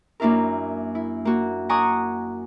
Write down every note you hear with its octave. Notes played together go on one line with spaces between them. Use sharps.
F#2 A#3 D4 E4 A#4
E4
A#3 F#4
D5 F#5 G#5 A#5 C#6 D#6